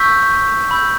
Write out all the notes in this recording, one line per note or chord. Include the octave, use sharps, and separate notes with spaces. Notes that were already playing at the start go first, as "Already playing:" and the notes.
Already playing: C#6 E6 G6 B6
B5 E6 G6